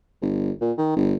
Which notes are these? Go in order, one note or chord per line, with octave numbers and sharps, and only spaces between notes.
G1
A#2
D#3
G1